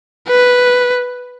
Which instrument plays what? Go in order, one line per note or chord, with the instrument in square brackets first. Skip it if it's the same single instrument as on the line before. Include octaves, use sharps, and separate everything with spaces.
[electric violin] B4